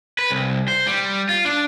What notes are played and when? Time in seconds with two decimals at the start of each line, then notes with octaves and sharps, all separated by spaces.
0.19 B4
0.30 C2
0.68 C5
0.87 G3
1.29 F4
1.45 D4